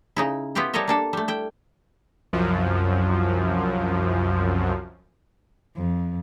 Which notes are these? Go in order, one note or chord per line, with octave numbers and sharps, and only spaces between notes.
C#3 D#4 E4
B3 E4 F4 G4 G5
G3 A4 A#4 C#5 D#5 E5
A#3 D4 A4
G3 A3
E4 G5
C2 F#2 F3
F2